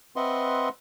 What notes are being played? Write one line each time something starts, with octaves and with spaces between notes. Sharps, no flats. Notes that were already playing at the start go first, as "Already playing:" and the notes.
C4 B4 D#5 E5 F#5 C6